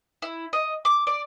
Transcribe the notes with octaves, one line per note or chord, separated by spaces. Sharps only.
E4
D#5
D6
D5